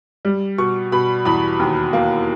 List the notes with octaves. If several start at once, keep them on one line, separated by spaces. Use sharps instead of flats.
G3
B2 C#6
B2 B5
E2 B5
D#2
A#3